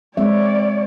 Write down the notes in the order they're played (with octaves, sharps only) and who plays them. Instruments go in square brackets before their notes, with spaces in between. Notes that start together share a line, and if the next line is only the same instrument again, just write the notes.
[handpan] G#3 C4 E5 [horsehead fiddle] C#5 D5